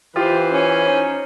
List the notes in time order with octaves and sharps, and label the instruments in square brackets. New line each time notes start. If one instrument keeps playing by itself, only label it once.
[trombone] E3 [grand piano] F4 G4 [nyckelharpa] B4 C5
[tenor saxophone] C#4
[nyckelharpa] D#4 C5